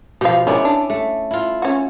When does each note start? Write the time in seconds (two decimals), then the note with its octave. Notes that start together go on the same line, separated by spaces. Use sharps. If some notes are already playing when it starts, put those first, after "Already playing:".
0.21 B2 F3 G4 F5
0.47 D#3 G#3 C#4 E4 D5
0.65 D4
0.90 A3
1.31 E4 F4
1.62 C#4 F#4